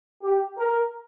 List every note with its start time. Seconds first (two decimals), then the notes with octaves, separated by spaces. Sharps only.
0.23 G4
0.58 A#4